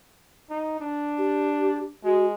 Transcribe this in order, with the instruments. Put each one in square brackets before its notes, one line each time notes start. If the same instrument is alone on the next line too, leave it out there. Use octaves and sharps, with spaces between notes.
[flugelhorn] D#4
D4
[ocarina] G4
[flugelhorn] G#3 [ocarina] F#4